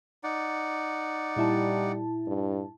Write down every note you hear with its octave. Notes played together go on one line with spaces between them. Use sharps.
D#4 D5 F#5
A#2 G3 E4 A5
G2